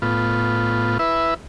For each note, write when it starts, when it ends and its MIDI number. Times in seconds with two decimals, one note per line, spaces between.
0.02 0.98 45
0.02 0.98 59
0.02 0.98 65
0.99 1.34 64
0.99 1.34 71
0.99 1.34 76